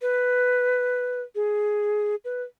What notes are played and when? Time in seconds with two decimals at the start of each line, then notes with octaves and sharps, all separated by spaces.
0.02 B4
1.35 G#4
2.25 B4